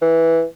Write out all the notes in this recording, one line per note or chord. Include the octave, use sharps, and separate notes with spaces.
E3